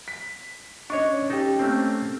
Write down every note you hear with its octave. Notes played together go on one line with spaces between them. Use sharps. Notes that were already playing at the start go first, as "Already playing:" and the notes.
B6
C#4 D4 C#5 D#5 C#6
C#4 D#4 G4 A4
A3 A#3 C4